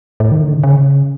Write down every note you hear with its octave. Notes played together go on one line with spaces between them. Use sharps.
A2
D#3
D3
C#3
C#3